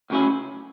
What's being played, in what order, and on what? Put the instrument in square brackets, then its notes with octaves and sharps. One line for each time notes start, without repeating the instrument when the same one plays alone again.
[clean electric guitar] D2 C#3 F#3 C#4 E4